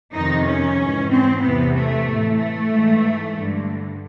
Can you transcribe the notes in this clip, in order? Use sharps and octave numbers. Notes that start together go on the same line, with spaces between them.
F2 C3 D#3 D#4
C#4
G#2 E3
C4
E2 C3 E3 B3
A3
A2 E3
A3
G#2 E3
G2 D3